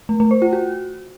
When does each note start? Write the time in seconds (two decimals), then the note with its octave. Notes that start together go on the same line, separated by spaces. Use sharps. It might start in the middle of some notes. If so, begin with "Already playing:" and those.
0.09 A3
0.20 A3
0.31 C5
0.42 F4
0.53 F#4